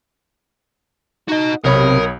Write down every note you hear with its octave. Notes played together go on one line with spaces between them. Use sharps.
D#4 F#4 D#5
B1 C3 A#4 C#5 B5 D#6